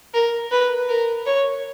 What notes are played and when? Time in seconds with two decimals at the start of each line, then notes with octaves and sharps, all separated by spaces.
0.14 A#4
0.51 B4
0.89 A#4
1.26 C#5